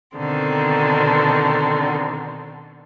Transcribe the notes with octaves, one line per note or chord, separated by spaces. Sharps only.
B2 D3 D#3 C4